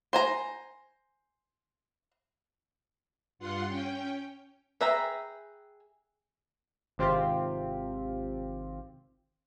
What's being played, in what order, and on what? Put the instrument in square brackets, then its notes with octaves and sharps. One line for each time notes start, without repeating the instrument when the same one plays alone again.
[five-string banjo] C5 G#5 A#5
[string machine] G2 F4 F#5 C6
C#4 G5
[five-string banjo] G#4 B4 E5 G5 A#5
[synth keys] G#1 C3 C4 F4 G4